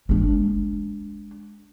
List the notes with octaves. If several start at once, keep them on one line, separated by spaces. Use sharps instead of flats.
G#3 D4